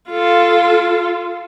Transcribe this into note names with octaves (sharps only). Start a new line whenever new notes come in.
F4 A4